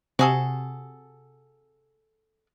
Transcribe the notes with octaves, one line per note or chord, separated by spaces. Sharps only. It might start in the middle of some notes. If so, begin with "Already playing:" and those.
C3 F#4 G#4 A4